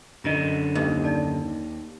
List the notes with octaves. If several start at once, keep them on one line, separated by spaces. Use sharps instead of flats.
F#2 D3 D#5 A#5
D#2 D#5
D#4 D5 A5